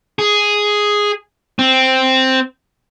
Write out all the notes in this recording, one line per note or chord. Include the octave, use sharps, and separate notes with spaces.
G#4
C4